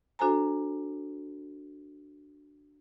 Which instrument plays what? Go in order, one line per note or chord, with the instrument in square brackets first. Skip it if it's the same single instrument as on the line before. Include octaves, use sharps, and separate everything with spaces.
[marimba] D4 F#4 A4 C5 G#5 A#5